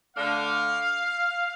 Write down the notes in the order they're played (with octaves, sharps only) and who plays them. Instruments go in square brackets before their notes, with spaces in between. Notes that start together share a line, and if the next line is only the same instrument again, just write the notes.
[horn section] D3 A3 D4 F5